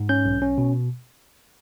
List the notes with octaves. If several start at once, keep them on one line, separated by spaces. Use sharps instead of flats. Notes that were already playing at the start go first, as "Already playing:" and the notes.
Already playing: G#2
C#4 G6
B1
C#4
B2